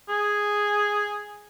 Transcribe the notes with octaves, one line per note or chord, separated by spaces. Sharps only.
G#4